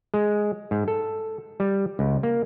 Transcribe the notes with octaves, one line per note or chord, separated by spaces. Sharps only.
G#3
G#2
A4
G3
C#2
A#3